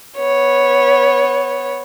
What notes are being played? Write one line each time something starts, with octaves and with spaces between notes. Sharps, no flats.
B3 C#5